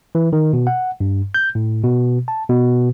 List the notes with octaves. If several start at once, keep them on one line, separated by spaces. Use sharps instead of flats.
E3
D#3
B2
F#5
G2
G6
A2
B2
A5
B2